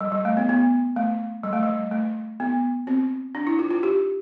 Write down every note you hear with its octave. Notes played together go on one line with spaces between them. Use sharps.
G3
G3
A3
B3
B3
A3
G3
A3
G3
A3
B3
C4
D4
E4
F4
F4
G4